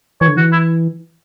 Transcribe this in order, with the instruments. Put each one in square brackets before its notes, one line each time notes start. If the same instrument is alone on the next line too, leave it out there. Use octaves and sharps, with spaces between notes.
[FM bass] E3 [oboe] C#5
[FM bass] D3
[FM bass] E3 [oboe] F#4
[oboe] E4